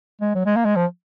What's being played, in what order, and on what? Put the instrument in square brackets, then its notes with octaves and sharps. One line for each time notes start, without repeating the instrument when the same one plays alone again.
[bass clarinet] G#3
F#3
G#3
A#3
G#3
F3